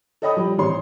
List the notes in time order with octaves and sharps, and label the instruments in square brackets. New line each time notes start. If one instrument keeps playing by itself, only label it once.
[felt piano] A4 C#5 D#5 G5 B5 D#6
F3 G3
A1 C4 C#5 C6